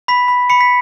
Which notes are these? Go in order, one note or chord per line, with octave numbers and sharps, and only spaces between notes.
B5 B6
B5
B5 C#7
B6